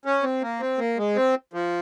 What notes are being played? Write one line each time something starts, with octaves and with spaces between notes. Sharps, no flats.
C#4
C4
A#3
C4
A#3
G#3
C4
F3